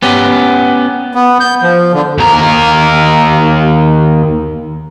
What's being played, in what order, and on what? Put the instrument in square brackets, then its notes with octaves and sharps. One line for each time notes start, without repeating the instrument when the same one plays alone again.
[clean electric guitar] B3 C#4 G4
[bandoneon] B3
G6
F3
D3
[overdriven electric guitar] D#2 A#4